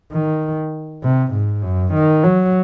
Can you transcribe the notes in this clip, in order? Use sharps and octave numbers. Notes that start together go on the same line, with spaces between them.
D#3
C3
G#2
F#2
D#3
F#3